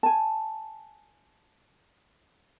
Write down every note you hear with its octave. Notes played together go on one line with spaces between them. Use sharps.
G#5 A5